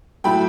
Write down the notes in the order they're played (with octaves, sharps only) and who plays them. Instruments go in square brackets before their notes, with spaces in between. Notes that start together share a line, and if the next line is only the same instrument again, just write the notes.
[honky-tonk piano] A2 F#3 A3 E4 G5 B5